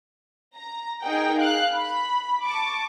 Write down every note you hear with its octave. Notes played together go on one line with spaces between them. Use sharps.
A#5
D#4 G#4 A#4 F#5 G5
F5 F#6
B5
A5 C#6 D6